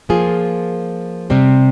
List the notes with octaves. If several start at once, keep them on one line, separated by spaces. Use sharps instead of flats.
F3 A#3 F4 G#4
C3 G3 C4